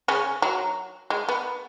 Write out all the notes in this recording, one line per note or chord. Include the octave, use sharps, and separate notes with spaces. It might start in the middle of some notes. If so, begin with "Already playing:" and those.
C#3 C#4
F#3
G#3
B3